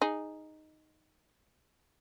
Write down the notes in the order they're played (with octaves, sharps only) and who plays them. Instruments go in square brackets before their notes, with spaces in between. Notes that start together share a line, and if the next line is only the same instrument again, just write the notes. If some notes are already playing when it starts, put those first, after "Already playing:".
[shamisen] D#4 G#4